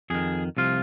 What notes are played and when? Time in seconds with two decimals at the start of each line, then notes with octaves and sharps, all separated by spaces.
0.10 F2 D#3 G#4
0.57 C2 C3 F3 F4